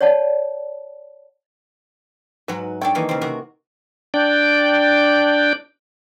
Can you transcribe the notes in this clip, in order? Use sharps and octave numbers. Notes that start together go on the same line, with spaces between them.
C#5 D5 F#5 A5
G#2 F#3 F#4 B4
D4 A4 C#5 G5
D#3 E3 A#3
C#3 C4
C3 F#4 A#4
D4 D5 G5